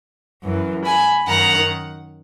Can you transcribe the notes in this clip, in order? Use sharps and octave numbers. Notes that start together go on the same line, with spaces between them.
F#2 E3
G#5 B5
F#2 D#3 F#5 A#5